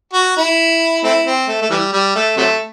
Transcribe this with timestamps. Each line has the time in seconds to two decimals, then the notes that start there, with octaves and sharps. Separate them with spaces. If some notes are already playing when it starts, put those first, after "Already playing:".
0.13 F#4
0.36 E4
1.04 A3 C4 E4
1.26 C4
1.48 A3
1.62 A3
1.70 E3 G3
1.93 G3
2.16 A3
2.37 C3 F#3 A3